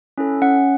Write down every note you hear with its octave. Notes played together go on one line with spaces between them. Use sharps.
C#4 E4 A4
C#4 F#5